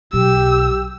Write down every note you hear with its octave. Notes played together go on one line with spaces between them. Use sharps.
B1 G4 E6